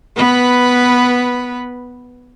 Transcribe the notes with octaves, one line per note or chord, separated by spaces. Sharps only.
B3 B4